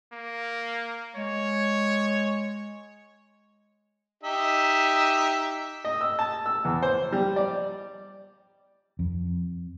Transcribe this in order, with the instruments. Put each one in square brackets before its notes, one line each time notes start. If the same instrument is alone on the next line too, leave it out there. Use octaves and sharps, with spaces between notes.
[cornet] A#3
[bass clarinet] G#3 [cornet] C#5
[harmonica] D#4 G4 E5
[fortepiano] D#5
E6
A5
E6
E2
C5
G3
D5
[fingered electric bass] F2